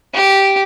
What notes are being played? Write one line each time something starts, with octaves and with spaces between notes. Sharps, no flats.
G4